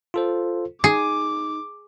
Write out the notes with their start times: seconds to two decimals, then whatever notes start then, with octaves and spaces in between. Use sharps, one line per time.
0.14 F4 A4 C5
0.84 D#4 G#4 D6